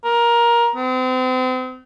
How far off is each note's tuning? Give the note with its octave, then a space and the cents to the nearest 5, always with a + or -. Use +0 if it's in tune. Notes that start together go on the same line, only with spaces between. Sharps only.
A#4 +15
C4 -35